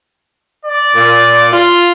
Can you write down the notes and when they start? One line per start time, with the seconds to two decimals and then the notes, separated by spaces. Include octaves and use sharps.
0.65 D5
0.95 A#2
1.51 F4